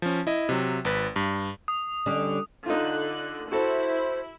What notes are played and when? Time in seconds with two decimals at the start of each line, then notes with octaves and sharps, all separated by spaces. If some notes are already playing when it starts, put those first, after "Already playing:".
0.02 F3 C#4
0.27 E4 D#5
0.49 C3 F#3
0.85 G#1 B4 B6
1.16 G2
1.68 D#6
2.06 D3 G3 C#4
2.66 D3 D#4 F4 F#6
3.52 E4 F#4 A4 C5